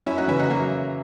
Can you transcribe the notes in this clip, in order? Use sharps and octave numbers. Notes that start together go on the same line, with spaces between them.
F#2 C#4 E4
D#4 F#4
C#3 E3 C#4 E4
D#4 F#4
F#3 A#3